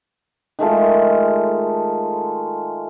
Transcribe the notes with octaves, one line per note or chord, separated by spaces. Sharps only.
D#3 G#3 A3 F4